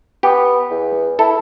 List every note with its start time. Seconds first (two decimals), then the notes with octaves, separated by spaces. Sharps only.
0.23 B3 G4
0.70 E2
1.19 E4 A4